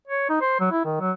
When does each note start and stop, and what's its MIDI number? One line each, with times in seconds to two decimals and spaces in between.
0.08 0.26 73
0.30 0.40 63
0.41 0.56 72
0.60 0.70 54
0.71 0.82 64
0.85 0.98 51
1.00 1.12 54